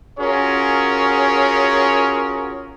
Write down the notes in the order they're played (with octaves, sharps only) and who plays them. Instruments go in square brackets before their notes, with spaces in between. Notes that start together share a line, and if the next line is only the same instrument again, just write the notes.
[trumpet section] C#4 F4 F#4 G#4 A#4 C#5